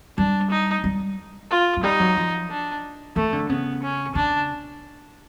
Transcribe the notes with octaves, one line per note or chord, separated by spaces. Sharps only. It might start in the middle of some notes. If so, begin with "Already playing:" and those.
G3 D4
D#4
G3
F4
F#3
G3 D#4
F#3
F3
D4
E3 A3
D3
C#3 B3
C#4
C#3 D4